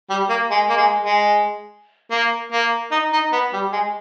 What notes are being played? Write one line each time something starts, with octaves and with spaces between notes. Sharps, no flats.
G3
A#3
G#3
A#3
G#3
G#3
A#3
A#3
D#4
D#4
B3
G3
G#3